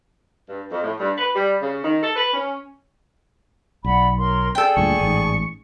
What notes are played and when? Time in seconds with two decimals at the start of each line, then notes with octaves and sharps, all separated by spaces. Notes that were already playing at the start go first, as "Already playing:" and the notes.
0.49 G2
0.70 F2
0.84 A2
0.99 G2
1.18 B4
1.34 G3
1.61 C#3
1.82 D#3
2.02 A4
2.16 B4
2.33 C#4
3.84 B1 D5 F#5 B5
4.18 A#4 C#5 C6
4.55 G#4 A4 D5 G5
4.77 D2 G2 A#2 C#6
5.00 A1 G#2